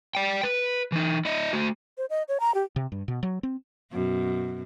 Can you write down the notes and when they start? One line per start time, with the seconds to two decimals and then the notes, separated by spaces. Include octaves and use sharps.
0.15 D5 G5
0.43 B4
0.92 E3 D#4
1.25 E4 D#5
1.53 A3 F#4
1.98 C5
2.10 D#5
2.28 C#5
2.40 A#5
2.54 G4
2.76 C3
2.92 G2
3.08 B2
3.23 F#3
3.43 C4
3.92 F#2 B2